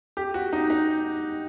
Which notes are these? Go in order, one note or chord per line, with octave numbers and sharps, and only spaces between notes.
G4
F#4
D#4
D#4